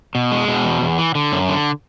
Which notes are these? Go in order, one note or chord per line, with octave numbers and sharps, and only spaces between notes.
B2
G#3
B2
E2
E2
E3
D3
F#2
D3